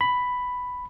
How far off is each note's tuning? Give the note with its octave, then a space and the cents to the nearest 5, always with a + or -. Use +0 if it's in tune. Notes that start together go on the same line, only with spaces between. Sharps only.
B5 +5